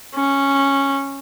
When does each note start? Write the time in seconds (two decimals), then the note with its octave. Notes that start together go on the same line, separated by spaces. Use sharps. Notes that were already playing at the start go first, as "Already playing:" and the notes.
0.15 C#4